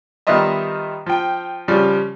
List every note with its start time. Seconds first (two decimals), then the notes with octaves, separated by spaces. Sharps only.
0.27 D#3 G3 B3 F4 D#5 E5
1.06 F3 G5
1.68 C#3 F3 G3